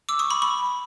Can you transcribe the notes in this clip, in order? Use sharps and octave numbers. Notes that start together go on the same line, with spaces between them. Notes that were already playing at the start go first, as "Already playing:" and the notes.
D6 E6
C#6 D#6
B5 C#6
B5 C#6